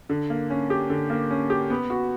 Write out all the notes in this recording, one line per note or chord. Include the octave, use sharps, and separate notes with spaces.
D3
A#3
C#4
G4
D3
A#3
C#4
G4
B3
F#4